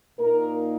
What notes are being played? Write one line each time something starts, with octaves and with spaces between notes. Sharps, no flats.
A#2 A#3 D#4 A#4